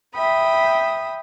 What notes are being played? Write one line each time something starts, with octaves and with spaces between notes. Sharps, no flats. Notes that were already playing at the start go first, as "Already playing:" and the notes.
E5 G5 B5 D#6